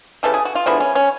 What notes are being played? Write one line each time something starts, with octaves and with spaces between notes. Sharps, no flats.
C#3 E3 G3 A4
G#4
F#4
F4
D3 F3 G#3 B3 E4
C#4
C#4